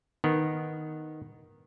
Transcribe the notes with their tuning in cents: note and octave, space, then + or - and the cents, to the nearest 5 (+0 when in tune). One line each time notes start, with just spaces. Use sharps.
D#3 +0 B3 +0